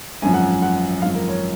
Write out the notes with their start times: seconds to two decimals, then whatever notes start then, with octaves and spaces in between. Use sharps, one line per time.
0.22 G#1 F#2 F3 G#5
0.34 F#5
0.45 G#5
0.62 F#5
1.02 G#1 F#2 F3 F5
1.15 A#4
1.29 C#5